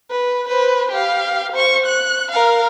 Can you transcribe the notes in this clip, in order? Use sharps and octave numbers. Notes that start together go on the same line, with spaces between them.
B4
B4 C5
G4 F5
C5 C#6
F#6
A#4 F5